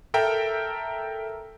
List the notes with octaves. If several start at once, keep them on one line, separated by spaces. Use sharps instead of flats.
A4 A#4 E5 G5 A#5